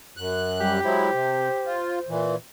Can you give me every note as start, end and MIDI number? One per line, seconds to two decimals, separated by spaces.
0.17 0.80 42
0.17 0.80 90
0.60 0.80 55
0.60 1.77 67
0.84 1.10 54
0.84 1.10 56
0.84 1.10 64
0.84 2.09 72
1.13 1.49 48
1.66 1.99 65
2.09 2.36 46
2.09 2.36 52